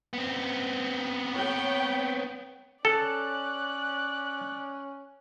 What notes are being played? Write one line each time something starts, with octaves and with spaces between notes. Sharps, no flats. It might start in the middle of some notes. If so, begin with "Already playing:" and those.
B3 C4
C#5 G5
C#4 A4 D5 F#6